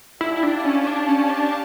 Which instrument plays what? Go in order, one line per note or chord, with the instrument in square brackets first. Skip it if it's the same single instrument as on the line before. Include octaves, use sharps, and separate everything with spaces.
[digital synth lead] E4 [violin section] G4 D5 F5 A5
[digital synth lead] E4
D4
C#4
D4
C#4
D4